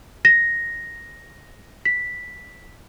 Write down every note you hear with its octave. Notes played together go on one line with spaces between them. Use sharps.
A#6
B6